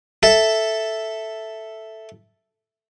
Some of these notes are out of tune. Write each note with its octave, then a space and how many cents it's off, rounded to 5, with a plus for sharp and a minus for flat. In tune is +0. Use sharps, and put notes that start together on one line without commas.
A4 +0 E5 +0